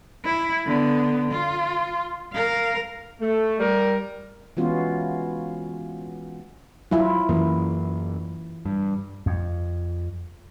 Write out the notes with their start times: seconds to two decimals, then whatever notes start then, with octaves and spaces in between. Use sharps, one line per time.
0.25 E4
0.66 D3 B3
1.32 F4
2.33 A#4 F5
3.21 A3
3.60 G3 A#4
4.57 E3 G#3 B3 C#4 F4 F#4
6.91 F#3 E4 F4
7.29 F#2 E3 A#3
8.65 G2
9.26 F2